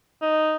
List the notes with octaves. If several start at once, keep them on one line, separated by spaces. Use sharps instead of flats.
D#4